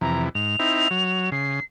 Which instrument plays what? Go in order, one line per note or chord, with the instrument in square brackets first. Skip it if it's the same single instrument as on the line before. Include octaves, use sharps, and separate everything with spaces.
[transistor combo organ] F2 C3 E3 [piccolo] A#5
[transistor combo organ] G#2 [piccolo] F7
[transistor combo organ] C4 D#4 E4
F#3
[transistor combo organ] C#3 [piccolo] C7